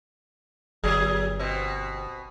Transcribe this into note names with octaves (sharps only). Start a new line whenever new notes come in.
G1 F#3 G#4
B2 C4